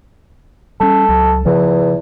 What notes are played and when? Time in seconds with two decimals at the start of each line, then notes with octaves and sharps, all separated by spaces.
0.80 G3 C#4 A4
1.09 C#2 F#3
1.46 E2 C#3 F3